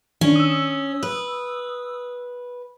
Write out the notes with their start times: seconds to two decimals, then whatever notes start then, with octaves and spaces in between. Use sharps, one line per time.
0.21 D#3 C#4 D4
0.36 D#6 E6
1.03 B4